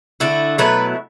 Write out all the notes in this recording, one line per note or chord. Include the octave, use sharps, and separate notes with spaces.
D3 A3 E4
B2 F#3 A3 E4 B4